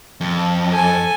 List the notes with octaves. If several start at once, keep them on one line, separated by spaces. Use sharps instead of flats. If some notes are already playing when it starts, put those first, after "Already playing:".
F2
A4 G#5